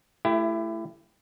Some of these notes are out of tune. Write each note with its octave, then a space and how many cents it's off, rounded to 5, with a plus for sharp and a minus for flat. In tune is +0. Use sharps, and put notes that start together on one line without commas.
A3 +0 E4 +25 G4 +10